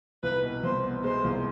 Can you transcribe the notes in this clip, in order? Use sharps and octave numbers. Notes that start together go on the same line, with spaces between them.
C2 B4
B2
C2 C5
B3
G#3 C5
C2